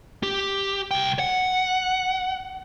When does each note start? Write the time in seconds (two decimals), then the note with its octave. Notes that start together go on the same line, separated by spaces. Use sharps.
0.23 G4
0.91 C2 G5
1.19 F#5